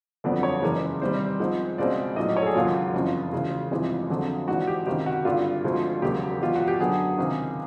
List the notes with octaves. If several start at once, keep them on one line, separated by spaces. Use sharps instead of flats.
G1 F2 D3 F#3 B3 D5
C#5
F#1 E2 C#3 E3 G#3 A#4
E2 C3 D#3 G3 C5
G#2 F3 G#3 C4
C#2 B2 G#3 C4 D5
A#1 A2 F#3 D#5
C#5
A4
G#4
E1 D#2 C#3 F#3 F4
F#1 F2 C#3 E3
E1 D2 C#3 E3
G1 F2 C3 E3 G#3
F2 D3 F#3
G#1 G#2 E3 G#3 F#4
G4
C#2 C3 D#3 G4
F#4
G#1 G2 D3 F4
D2 D3 F3 G#3 C4
E1 D#2 C#3 F#3 G4
E2 B2 F#3 F4
F#4
G4
F#2 D3 F#3 B3 D4 G#4
C#2 C3 D#3